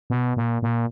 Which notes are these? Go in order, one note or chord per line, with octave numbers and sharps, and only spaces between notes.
B2
A#2
A#2